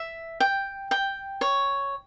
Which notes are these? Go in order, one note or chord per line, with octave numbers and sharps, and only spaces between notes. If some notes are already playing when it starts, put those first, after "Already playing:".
Already playing: E5
G5
G5
C#5